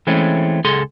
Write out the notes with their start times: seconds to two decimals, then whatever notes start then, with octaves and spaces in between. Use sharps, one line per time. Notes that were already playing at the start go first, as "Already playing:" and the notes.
0.07 E3 G#3 A3 C4 C#4
0.64 C#2 G#4 A4 C6